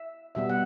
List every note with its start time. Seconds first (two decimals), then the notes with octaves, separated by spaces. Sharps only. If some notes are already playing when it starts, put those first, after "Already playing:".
Already playing: E5
0.35 B2 G3 B3 E5
0.50 F#5